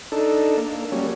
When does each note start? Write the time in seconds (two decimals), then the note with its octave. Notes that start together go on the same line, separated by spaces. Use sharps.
0.12 D4 D#4 A4
0.57 A#3
0.92 F#3 G3 C#4